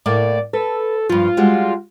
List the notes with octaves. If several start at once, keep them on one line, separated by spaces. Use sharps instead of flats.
A2 A#3 A4 D5
A4 B4
G2 F3 F4
G3 G#3 F#4